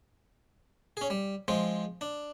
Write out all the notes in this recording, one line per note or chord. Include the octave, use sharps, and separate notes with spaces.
C#4 G#4
G3
F3 G#3 C4
D4